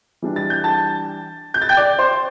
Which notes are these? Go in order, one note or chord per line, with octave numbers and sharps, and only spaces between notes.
E3 G3 D4
A6
G6
A5 A6
G6
A6
G5 G6
D5 D6
C5 C6